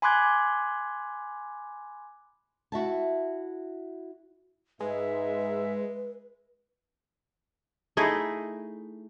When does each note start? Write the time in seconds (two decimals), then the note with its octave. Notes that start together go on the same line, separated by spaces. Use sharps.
0.02 G#5 B5 C6 D6 F#6 G#6
2.72 E4 F#4 E5 A5
4.80 G#2 G#3 D#4 B4 E5
7.97 A3 D#4 E4 G#4